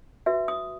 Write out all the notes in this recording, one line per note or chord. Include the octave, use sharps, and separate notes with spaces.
F#4 B4 E5
D#6